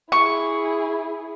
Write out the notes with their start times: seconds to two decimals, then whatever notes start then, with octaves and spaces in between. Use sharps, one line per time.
0.12 E4 G#4 C#6